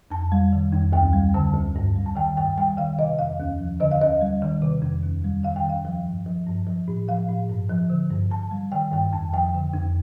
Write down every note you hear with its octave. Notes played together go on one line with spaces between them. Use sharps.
F2 A5
G3
D#3
F2
D2 G5
G3
D3 A5
D2
G2
G3
A5
D#3 G5
G2 G5
G3 G5
D#3 F5
C3 D#5
F2 F5
D#2
F3
D3 D#5
F5
D#2 D#5
G3
D#3
C3
F2
D#2
G3
D#3 F5
G5
D#2 F5
F3
G2
F3
G2
F3
A2
F3 F5
A2
G2
F3
D3
G2
G2 A5
G3
D#3 G5
G2 G5
F2 A5
F3 G5
D3
F2